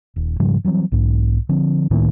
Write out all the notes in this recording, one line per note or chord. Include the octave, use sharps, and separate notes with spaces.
D#1
G#2 C#3 F3 G3
E3 F#3 G3 C4
B1 G#2
D3 F3 C4
C#2 A2 D#3 A#3